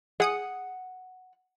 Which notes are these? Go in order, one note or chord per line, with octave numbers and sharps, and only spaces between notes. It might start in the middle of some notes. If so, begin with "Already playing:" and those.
G#4 F#5 D#6 C#7